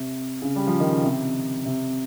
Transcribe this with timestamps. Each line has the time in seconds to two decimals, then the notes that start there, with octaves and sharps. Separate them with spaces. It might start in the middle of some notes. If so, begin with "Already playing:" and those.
Already playing: C3
0.42 C#3
0.56 G3
0.67 F3
0.80 D#3
0.91 C#3
1.04 C3
1.65 C3